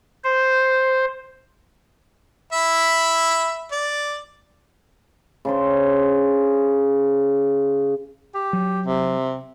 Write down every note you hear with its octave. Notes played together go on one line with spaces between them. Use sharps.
C5
E5 B5
D5
C#3 D4 C5
G4
F#3
C3